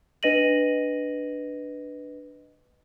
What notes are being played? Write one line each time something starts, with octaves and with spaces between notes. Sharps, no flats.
D4 B4 D#5 A#6 D#7 F#7